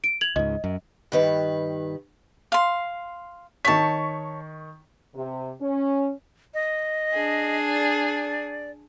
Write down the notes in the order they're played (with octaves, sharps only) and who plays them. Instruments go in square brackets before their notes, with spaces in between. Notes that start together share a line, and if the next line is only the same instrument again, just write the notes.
[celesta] D7
G#6 F7 F#7
[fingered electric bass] C#2 G#2 [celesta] D#5
[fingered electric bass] F#2
[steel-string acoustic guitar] G2 D#3 B4
[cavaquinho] F5 C6
[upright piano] D#3 C#6 B6 [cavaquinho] C#5 A5
[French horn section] C3
C#4
[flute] D#5
[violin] D4 G#4
[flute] D5